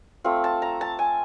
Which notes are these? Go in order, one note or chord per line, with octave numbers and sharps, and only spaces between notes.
A3 C4 F4
A5
A#5
A5
G#5